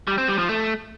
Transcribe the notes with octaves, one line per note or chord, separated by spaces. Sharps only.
G3
C4
G3
F3
A3